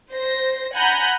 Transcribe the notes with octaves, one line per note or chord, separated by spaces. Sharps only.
C5 A#6
F#5 G#5 A#5 B5 F#6 G6